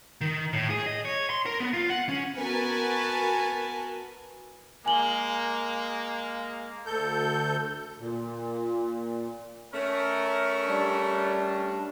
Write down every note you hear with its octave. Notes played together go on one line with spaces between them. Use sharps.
D#3
A2
G#4
D#5
C#5
C6
A#4
B3
F4
F#5
C#4
B3 F#4 A#4 B4 G#5 A5
G#3 A#3 G#5 F#7 G7
D2 A4 G6
A#2
A3 C#4 A#4
G3 D4